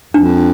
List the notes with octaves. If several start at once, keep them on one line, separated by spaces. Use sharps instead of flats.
F2 D4